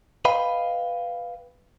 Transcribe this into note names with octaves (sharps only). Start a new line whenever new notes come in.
B4 D#5 F5 G5 B5